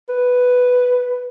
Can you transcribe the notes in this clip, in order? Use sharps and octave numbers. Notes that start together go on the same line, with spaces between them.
B4